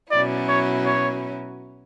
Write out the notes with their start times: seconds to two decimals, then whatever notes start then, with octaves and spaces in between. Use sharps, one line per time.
0.11 B2 F#3 C#4 E4 D5
0.48 C#5
0.86 C#5